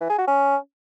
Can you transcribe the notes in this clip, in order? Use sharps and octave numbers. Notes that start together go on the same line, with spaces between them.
E3
G#4
F#4
C#4